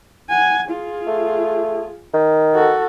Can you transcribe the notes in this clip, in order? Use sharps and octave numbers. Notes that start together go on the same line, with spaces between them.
F#5 G#5
F4 G#4
A3
D#3
F#4 A4